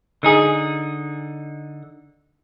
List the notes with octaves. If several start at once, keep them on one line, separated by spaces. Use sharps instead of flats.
D3 D#4 G#4